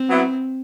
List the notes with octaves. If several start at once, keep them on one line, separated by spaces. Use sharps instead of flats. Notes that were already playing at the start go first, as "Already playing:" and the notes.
Already playing: C4
F#3 B3 E4